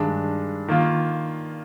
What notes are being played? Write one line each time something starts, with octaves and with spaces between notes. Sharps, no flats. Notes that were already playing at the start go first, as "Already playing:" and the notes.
Already playing: G2 D#3 G#3 D4
D#3 A#3 F4